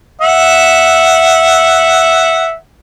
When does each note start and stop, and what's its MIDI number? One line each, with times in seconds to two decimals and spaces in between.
0.21 2.54 76
0.21 2.54 78